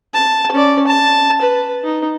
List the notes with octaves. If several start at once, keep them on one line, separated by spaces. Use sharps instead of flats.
A5
C#4 D5
A5
B4
D#4